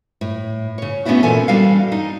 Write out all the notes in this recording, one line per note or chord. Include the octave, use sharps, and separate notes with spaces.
A2
C#3 C#5
A3 B3 C#4 D4 E4 F#4
A#2 E3 A4 G#5
G3 D4 F#4 A4 F5
D#4